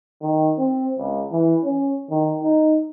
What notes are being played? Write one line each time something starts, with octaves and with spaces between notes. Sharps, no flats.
D#3
C4
C#2
E3
C#4
D#3
D#4